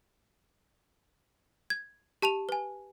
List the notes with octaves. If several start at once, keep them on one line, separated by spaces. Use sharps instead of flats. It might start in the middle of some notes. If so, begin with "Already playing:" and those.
G#6
G4 A5 D#7 F7
B4 G#5